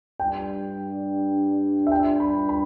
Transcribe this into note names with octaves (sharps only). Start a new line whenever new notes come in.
G2 G3 D4 G5
E5
G5
B5
B5